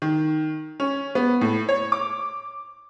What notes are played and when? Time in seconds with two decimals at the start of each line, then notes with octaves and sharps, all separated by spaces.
0.02 D#3
0.80 C#4
1.15 B3
1.41 A2
1.69 C#5
1.92 D6